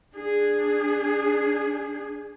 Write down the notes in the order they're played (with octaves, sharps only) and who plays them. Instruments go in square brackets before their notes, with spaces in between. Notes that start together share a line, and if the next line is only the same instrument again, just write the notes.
[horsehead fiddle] D4 G#4